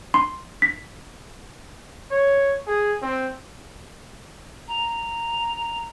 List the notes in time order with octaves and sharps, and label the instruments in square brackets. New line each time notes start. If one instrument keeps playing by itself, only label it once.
[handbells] C6
B6
[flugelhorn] C#5
G#4
C4
[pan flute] A#5